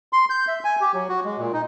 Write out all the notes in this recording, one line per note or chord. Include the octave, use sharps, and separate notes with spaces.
C6
G6
E5
G#5
G4
F#3
F#4
G#3
A#2
D#4